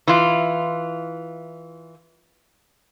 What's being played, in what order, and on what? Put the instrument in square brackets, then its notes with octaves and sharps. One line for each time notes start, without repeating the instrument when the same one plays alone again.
[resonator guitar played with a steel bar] E3 F4